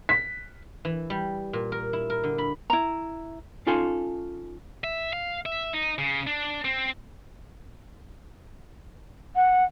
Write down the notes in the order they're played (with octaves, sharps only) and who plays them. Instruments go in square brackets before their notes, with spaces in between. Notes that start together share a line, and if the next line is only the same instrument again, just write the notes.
[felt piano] B6
[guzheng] E3
G3
A#2
A#4
E4
A#4
D3
B5
[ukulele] E4 A#5
[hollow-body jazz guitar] C#4 D#4 F4 A4 G#5 C6
[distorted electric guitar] E5
F5
E5
D#4
C#3
D4
C4
[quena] F#5